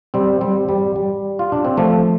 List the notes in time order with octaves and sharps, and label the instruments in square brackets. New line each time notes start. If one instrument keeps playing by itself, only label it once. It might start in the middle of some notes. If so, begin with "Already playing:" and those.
[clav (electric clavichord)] G3 C4
G3 C4
G3
G3
F4
D4
C4
F3 A3